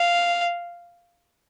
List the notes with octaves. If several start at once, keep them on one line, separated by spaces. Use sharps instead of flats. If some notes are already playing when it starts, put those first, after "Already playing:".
Already playing: F5